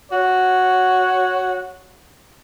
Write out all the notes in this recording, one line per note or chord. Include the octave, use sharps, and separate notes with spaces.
F#4 C#5